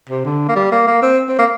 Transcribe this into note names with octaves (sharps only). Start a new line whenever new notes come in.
C3
D3
A#3
G3
A#3
A#3
C4
C4
A#3